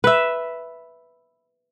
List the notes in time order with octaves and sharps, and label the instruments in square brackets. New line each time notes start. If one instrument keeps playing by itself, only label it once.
[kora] B4 E5